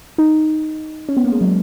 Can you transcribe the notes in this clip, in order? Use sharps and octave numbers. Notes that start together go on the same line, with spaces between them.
D#4
C#4
B3
A#3
G#3
F#3